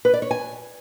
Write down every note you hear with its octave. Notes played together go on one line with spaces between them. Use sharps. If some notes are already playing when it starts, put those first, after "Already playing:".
B4
D5
C#5
G#5